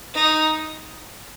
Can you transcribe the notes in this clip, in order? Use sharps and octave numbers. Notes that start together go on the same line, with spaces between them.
D#4